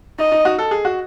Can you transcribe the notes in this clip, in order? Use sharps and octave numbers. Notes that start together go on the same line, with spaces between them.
D#4 D#5
D#4
D#4 F#4
A4
G#4
F#4